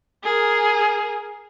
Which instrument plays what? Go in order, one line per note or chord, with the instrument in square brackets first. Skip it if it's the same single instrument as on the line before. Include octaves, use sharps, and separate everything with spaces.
[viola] G#4 A#4